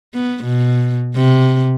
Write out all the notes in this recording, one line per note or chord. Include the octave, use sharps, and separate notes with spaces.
B3
B2
C3